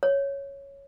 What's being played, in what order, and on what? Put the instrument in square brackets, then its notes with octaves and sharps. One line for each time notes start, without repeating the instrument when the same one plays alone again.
[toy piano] C#5